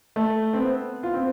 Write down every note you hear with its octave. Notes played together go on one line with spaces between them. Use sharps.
A3
C4
B3
F4
C4